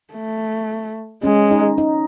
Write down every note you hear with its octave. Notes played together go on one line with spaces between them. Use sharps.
A3
G#3 C#4
D#4
D#4